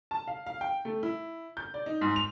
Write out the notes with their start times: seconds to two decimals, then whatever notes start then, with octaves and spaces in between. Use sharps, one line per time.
0.11 A5
0.28 F5
0.46 F5
0.61 G5
0.85 A3
1.03 E4
1.57 G6
1.74 D5
1.86 D#4
2.01 G#2
2.16 F7